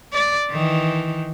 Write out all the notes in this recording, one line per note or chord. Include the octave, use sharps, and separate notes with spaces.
D5
D#3 E3